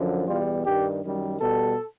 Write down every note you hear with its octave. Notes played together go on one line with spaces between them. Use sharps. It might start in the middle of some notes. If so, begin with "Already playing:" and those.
Already playing: F#2 D3 F3
E2 B2 G3 F4
G2 D#3 G3 G4
F#2 D#3 G3
B2 G3 A4